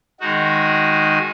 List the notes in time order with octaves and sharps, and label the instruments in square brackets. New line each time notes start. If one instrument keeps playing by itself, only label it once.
[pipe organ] D#3 G#3 D#4 F#4